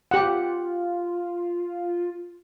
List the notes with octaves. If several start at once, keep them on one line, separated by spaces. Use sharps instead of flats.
F4 G4 F#5